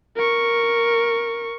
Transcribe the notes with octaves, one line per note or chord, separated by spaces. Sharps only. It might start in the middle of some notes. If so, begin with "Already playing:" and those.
A#4 C#6